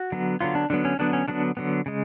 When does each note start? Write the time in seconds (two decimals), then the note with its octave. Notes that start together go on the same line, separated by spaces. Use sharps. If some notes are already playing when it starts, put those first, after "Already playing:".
Already playing: F#4
0.12 D3 F#3 B3
0.41 D3 F#3 B3 F4
0.55 D4
0.70 D3 F#3 B3 D4
0.85 C#4
0.99 D3 F#3 B3 D4
1.13 C#4
1.28 D3 F#3 B3 D4
1.57 D3 F#3 B3
1.86 C#3 G#3